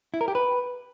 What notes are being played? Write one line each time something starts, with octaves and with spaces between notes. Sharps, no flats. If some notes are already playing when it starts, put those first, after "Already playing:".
E4
A#4
G4
B4